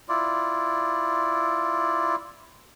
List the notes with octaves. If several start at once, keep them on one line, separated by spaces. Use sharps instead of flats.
E4 F4 D5